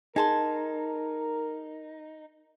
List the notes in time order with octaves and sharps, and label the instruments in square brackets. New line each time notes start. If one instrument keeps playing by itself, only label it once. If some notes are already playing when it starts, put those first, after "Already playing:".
[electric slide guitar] D#4 [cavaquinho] G#4 A5 C6 [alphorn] A#4